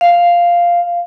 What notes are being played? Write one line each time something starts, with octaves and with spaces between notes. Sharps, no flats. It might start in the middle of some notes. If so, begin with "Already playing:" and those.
F5